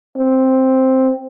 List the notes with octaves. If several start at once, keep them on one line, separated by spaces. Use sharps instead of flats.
C4